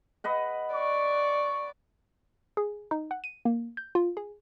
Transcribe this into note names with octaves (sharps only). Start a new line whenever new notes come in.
B4 D#5 F#5
D5 C#6
G#4
D#4
F#5
D#7
A#3
G6
F4
G#4